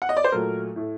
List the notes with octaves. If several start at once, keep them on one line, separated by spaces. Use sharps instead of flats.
F#5
D#5
D5
C5
A#2 F#3 A3 A#4
A2 A3